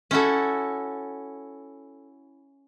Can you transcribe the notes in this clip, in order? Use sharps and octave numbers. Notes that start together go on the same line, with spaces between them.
C#4 E4 F#4 A4